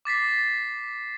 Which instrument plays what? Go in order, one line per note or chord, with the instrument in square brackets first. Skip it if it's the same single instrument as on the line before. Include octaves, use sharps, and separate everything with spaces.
[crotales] D6 A6 B6 C7